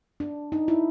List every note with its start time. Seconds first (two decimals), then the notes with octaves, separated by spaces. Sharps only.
0.20 D4
0.52 D#4
0.68 E4